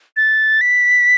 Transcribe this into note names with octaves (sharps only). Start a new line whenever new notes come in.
A6
B6